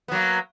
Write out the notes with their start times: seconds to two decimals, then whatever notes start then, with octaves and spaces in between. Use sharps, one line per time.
0.08 B3
0.12 F#3
0.15 A#3